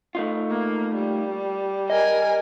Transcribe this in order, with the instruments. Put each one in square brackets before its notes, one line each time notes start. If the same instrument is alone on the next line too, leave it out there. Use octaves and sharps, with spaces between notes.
[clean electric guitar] A3 D#4 F4
[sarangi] A#3
G3
[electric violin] A#4 G#5 [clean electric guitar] D#5